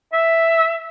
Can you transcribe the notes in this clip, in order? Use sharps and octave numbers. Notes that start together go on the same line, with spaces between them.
E5